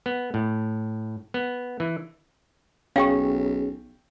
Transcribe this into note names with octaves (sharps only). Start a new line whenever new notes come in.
B3
A2
B3
E3
B1 C#4 G#4 F5 G5 C#6